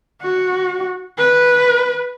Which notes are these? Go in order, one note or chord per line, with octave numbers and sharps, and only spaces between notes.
F#4
B4